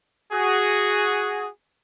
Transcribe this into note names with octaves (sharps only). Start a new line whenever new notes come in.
F#4 G#4